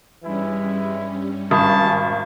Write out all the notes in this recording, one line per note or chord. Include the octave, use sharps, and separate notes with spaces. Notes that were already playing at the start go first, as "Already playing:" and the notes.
G2 E3 G3 G#3 C#4 E4
G#1 A#4 G#5 A5 B5 D#6